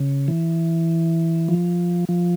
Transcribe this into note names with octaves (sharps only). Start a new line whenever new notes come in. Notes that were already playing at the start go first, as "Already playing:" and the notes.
Already playing: C#3
E3
F3
F3